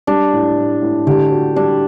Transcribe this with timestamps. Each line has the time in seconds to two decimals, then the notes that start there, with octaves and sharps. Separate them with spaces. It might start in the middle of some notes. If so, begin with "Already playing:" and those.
0.07 G3 D4
0.33 A2
0.57 A2
0.82 A2
1.07 D3 G4
1.31 F#4
1.56 G3 D4